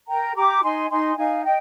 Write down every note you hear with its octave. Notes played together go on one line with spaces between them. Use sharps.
A#4 G5 A#5
G4 A#5 D6
D#4 G#5 C6
D#4 G#5 C6
D#4 F5 G#5
D#5 G5